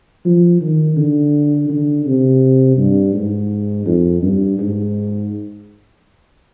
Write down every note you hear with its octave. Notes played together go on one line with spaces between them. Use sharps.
F3
D#3
D3
D3
C3
G2
G#2
F2
G2
G#2